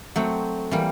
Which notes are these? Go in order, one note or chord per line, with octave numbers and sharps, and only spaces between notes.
F#3 A3 C4
E3 G3 A#3